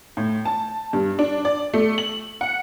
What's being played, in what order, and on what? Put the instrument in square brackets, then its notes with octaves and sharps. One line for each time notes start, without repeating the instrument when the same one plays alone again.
[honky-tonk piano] A2
A5
G2
D4
D5
A3
F#7
F#5